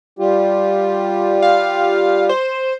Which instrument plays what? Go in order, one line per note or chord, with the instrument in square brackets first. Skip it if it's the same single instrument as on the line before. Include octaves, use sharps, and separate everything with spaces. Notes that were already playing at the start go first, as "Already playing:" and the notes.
[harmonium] G3 F4 G4
[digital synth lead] F5
C5